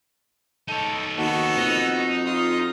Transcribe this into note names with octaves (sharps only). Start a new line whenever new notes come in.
D#4 A4 C#5
D#2 B3 F#4 A4
F2 D#4
F4 D#6